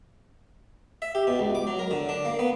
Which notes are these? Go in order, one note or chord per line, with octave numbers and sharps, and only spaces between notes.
E5
G4
B2
C#2
D6
F#3
A#4
D3
D4
A#3
B3